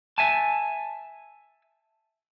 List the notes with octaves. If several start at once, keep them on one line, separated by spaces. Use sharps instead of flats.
E5 G#5 A5